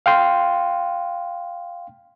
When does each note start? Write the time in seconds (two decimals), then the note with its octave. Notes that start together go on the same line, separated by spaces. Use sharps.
0.06 F5 G5 C6